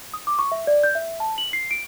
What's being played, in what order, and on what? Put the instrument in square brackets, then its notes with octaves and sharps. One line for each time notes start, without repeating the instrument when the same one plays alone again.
[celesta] D#6
D6
C#6
E5
D5
G6
E5
A5
F#7
C7
D7